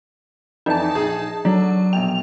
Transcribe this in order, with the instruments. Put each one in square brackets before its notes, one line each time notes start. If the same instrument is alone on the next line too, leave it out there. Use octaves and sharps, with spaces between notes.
[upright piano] F2 E3 D5 [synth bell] D#4 A5
[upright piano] A#1 G#4
[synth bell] F#3 [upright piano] D4 A4
[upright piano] A#1 B2 G5 [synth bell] F7